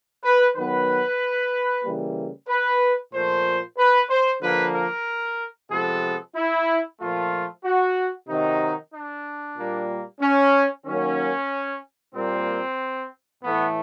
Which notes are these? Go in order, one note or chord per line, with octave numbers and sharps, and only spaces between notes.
B4
D#3 F#3 B3 B4
C#3 E3 G3 A#3
B4
A#2 F3 A3 C5
B4
C5
D3 F3 A#3 B4
A#4
C3 F3 G#3 B3 A4
E4
A#2 F3 A3 F4
F#4
C3 D#3 F#3 D#4
D4
A#2 G3 A#3
C#4
D#3 F#3 A#3 C#4
A#2 G3 A#3 C4
A2 E3 A3 B3